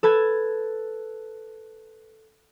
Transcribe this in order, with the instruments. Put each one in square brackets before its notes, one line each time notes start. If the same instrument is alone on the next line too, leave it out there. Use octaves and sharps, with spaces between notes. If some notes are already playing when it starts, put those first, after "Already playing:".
[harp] A4 B4 A5 G#6